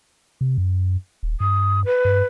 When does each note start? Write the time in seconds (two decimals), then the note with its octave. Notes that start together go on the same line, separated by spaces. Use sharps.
0.41 C3
0.58 F#2
1.23 D#1
1.40 G2 D#6
1.85 B4
2.05 G2